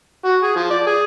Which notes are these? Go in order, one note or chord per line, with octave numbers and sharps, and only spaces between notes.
F#4
G#4
F3
D5
G#4